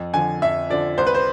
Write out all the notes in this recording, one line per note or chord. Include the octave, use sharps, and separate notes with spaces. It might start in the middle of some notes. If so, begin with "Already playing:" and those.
Already playing: F2
D3 F3 G#5
F2 E5
D3 F3 D5
C2 C5
B4
C5